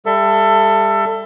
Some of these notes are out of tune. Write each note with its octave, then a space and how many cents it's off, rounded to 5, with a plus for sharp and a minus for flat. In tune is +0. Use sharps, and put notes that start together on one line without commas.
G3 +40 A4 +20 E5 +25